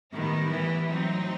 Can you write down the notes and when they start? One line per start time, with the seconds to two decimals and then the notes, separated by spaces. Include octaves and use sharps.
0.13 A2 D#3 G3 B3 E4
0.50 E3
0.88 A2 F#3 C4 D#4